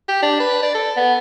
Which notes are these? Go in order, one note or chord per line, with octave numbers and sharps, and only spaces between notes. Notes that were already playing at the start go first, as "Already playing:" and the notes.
G4
D4
B4
D5
A4
B3